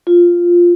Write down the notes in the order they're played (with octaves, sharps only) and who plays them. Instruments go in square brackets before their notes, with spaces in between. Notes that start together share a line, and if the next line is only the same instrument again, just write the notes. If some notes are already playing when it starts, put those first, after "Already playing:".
[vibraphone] F4